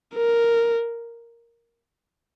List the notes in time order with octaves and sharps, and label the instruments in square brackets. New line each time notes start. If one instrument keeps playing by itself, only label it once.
[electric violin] A#4